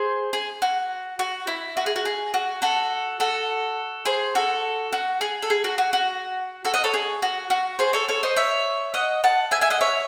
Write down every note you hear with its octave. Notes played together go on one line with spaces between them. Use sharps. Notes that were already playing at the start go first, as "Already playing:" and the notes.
Already playing: G#4 C5
G#4
F#4
F#4
E4
F#4
G#4
F#4
G#4
F#4
F#4 A4
F#4 A4
G#4 C5
F#4 A4
F#4
G#4
A4
G#4
F#4
F#4
F#4
F#4 A4
D#5 F#5
A4 C#5
G#4
F#4
F#4
G#4 C5
A4 C#5
A4 C#5
C5 D#5
C#5 E5
D#5 F#5
F#5 A5
E5 G#5
E5 G#5
D#5 F#5
C#5 E5